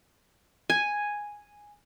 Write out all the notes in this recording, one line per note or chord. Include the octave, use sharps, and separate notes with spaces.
G#5